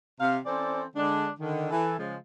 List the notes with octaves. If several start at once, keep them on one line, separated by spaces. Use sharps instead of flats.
C3 F5
E3 C4 C#4 A4 C5 D5
D3 G#3 D4
D3 D#3
E3 A4
C#3 F3 G#3